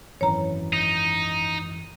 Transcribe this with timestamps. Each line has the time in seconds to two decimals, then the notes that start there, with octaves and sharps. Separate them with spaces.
0.21 G#1 F#2 E3 C#5 A#5
0.73 D#4